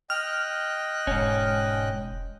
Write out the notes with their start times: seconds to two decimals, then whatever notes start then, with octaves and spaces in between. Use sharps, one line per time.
0.10 D#5 G5 F6 F#6
1.07 E1 G#2 C#4